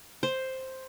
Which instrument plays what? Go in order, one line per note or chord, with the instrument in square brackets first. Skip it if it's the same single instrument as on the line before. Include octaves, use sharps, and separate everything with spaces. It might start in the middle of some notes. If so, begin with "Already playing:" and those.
[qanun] C5